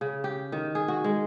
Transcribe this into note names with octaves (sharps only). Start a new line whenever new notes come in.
C#3
G4
D#3
G#4
F#4
G#3